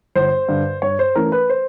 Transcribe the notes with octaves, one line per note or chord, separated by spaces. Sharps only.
G1 C5
G2 D3
G2 C#5
C5
E3 A3 C#4 A#4
B4
C5